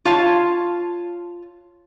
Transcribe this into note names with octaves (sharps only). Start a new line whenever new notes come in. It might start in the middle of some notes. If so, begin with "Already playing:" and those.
F4 C#5 F5 A5